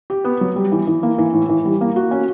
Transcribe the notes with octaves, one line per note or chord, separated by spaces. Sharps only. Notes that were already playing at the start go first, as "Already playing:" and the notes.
G4
B3
F#3
G3
E3
E3
A#3
E3
A2
E3
G3
A#3
F#4
C#4